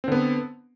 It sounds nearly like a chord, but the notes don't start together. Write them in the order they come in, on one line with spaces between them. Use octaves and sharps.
C4 D3 B3